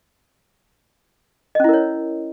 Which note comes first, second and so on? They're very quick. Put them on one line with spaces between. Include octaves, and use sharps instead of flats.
D#5 C#4 E4 A#4 C#5